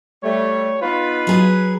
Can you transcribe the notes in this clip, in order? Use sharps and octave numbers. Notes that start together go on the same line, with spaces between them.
G3 A3 C#5
B3 D#4 F4 B4
F#3 G#4